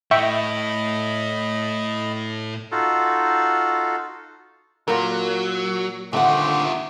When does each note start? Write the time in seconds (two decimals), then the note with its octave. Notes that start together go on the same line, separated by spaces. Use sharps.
0.11 A2 D#5 E5 G5 B5 C#6
2.72 D#4 F4 F#4 A4
4.88 A#2 F#3 A#4
6.13 D3 D#3 A3 C4 F4 G4 F#5